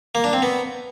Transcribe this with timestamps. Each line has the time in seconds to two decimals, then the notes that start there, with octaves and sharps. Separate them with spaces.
0.15 A#3
0.24 D4
0.33 C4
0.42 B3